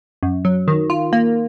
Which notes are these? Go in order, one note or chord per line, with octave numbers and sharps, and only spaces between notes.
F#2
F#3
D#3
F4
A#3